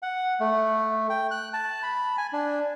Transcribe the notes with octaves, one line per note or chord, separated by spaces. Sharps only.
F#5
A3
G5
F#6
A5
B5
G#5
D4